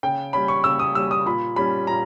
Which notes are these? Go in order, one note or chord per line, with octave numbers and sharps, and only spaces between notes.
C#3 G5
G3 C#4 B5
C#6
C#3 E6
D#6
G3 C#4 E6
D#6
A#2 B5
G3 C#4 B5
A#2 A#5